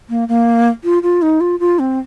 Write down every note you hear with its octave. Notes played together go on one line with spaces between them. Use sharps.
A#3
A#3
F4
F4
D#4
F4
F4
C4